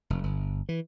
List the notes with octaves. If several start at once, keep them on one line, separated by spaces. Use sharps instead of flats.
F1
G1
E3